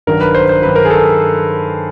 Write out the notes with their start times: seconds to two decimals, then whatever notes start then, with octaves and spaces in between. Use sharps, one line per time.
0.07 G2 D#3 F#3 A#4
0.21 B4
0.35 C5
0.49 C5
0.62 G2 D#3 F#3 B4
0.75 A#4
0.85 G#4
0.90 A4